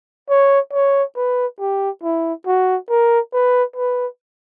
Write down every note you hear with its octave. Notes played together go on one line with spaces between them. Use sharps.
C#5
C#5
B4
G4
E4
F#4
A#4
B4
B4